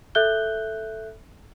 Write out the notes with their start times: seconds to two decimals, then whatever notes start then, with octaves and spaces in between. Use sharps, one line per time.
0.15 A4 E5 F#6 G6 G7